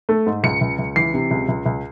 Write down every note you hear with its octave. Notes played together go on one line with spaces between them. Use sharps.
A3
G#2
C#2 C#7
C#2
C#2
E3 C7
C3
C#2
C#2
C#2